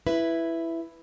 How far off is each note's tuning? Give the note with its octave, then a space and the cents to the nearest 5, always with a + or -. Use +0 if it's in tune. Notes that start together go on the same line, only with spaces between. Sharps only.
E4 +5 B4 +0